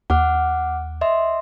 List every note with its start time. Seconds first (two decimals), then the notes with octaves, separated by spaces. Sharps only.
0.10 D#2 F#5 D6 F6
1.01 D#5 E5 C6